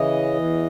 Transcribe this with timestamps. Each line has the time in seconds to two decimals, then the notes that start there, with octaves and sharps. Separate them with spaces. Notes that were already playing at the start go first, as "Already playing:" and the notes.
Already playing: C#3 E3 D#5
0.34 E2